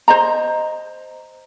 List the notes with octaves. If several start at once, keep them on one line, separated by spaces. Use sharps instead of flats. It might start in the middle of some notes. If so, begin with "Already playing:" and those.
C5 D#5 A#5